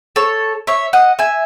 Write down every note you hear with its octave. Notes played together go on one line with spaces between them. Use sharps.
A4 C#5
C#5 E5
D#5 F#5
E5 G#5